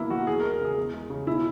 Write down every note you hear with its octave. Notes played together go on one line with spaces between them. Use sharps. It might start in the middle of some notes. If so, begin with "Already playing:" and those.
Already playing: B2 E3 A#3 E4
F#3 F#4
E2 G#4
A#4
G#3
A#4
C#3 G#4
E2
G#3
C#3
B2 E4